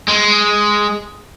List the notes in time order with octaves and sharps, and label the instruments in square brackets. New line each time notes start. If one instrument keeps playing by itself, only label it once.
[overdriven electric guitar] G#3